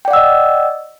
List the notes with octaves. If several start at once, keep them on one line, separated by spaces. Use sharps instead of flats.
D5 D#5 F#5 G5 E6